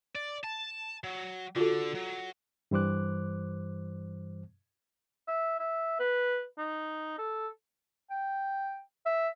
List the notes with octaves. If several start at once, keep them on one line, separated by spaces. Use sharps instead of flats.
D5
A5
F#3
D3 F4 F#4 A4
F#3
G2 E3 G3 C5 D6 F#6
E5
E5
B4
D#4
A4
G5
E5